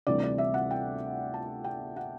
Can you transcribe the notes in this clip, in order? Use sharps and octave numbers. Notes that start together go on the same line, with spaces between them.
D2 C3 E3 G3 D5
D5
E5
F#5
G5
A5
G5
F#5